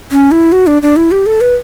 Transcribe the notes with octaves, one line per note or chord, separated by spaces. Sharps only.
C#4
E4
F#4
D4
D4
E4
G4
A4
B4